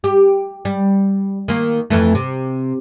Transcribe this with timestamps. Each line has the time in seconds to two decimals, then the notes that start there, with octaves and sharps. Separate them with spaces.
0.04 G4
0.65 G3
1.48 D#3 A#3
1.90 F2 E3 A3
2.15 C3